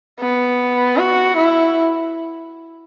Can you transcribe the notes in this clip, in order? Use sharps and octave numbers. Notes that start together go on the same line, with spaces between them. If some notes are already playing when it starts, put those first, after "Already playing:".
B3
F#4
E4